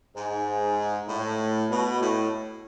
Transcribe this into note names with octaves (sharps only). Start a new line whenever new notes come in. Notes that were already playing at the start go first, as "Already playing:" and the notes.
G#2
A2
B2
A2